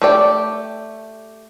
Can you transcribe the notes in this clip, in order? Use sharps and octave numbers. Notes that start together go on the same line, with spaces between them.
A3 G4 D5